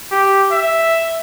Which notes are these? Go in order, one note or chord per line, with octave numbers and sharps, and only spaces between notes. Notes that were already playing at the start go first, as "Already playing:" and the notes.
G4
E5